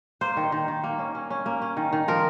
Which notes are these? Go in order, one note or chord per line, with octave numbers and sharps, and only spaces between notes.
A#3 C5
D#3
D#3
D#3
A#3
C#4
C#4
C#4
A#3
C#4
D#3
D#3
F3 A#4